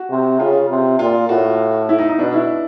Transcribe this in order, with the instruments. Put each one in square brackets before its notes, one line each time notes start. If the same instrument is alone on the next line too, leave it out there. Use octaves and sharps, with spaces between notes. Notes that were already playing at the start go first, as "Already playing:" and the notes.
Already playing: [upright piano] F#4
[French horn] C3
[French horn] C#3 [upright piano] F4
[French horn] C3
[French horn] A#2 [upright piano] F4
[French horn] A2 [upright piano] F#4
[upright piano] E4
D#4
D#4
[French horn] B2 [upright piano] D4
[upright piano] E4